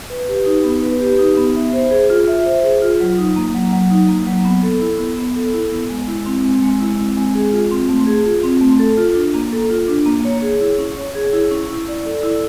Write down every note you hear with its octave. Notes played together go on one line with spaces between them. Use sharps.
B4
G4
D#4
B3
B4
G4
D#4
B3
E5
C5
G#4
F4
E5
C5
G#4
F4
F#3
D#4
A#3
F#3
F#3
D#4
A#3
F#3
B3
A4
E4
B3
B3
A4
E4
B3
G#3
E4
C4
G#3
G#3
E4
C4
G#3
G#4
F4
C4
A3
G#4
F4
C4
A3
A4
F4
D4
A#3
A4
F4
D4
A#3
C#5
G#4
E4
C#4
C#5
G#4
E4
C#4
E4
D5
A4
E4